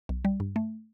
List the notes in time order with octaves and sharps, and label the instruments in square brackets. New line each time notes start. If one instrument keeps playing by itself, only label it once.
[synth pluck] B1
G3
G2
A3